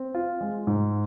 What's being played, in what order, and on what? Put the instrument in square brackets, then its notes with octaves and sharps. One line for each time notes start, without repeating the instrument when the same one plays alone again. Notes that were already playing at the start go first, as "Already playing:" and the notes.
Already playing: [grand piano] C4
F4
G#3
G#2